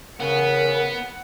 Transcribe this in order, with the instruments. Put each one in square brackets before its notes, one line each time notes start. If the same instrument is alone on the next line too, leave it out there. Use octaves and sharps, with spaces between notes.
[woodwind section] C#3 [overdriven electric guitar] B3 [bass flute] A#4 [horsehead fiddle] F#5